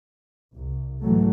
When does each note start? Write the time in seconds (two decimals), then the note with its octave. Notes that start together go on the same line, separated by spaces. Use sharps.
0.54 C2
1.00 G#2 E3 F#3 A3